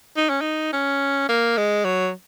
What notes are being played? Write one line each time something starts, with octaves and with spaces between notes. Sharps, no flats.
D#4
C#4
D#4
C#4
A#3
G#3
F#3